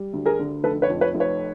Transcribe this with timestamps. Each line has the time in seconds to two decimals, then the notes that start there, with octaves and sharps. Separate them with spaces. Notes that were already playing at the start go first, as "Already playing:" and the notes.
Already playing: G3
0.13 D2
0.26 G#4 A#4
0.39 D3
0.64 F1 A4 B4
0.82 B4 C#5
0.90 F2
1.01 B4 C#5
1.15 F1
1.20 B4 C#5